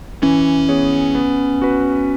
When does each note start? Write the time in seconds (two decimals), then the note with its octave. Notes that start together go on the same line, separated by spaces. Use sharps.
0.23 E3 C#4
0.69 B3 G#4 C#5
1.15 B3
1.62 F#4 B4